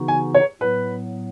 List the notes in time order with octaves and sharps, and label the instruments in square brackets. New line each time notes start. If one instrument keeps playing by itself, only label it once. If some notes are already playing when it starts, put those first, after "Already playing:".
Already playing: [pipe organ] C#3 E3 B3 D#4 F#4
[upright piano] G#5
C#5
[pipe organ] A2 F#3 B3 [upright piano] B4